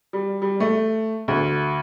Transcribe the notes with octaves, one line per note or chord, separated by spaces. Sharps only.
G3
G3
A3
D2